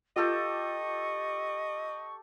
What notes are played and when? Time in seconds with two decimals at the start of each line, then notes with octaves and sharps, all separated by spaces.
0.16 F4 G4 A4 D#5 G5 C#6